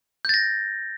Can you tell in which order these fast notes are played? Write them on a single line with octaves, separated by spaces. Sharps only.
G6 A6 A#6